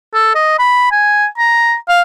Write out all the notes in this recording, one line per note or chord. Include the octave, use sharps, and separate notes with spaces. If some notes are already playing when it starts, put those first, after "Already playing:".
A4
D#5
B5
G#5
A#5
F5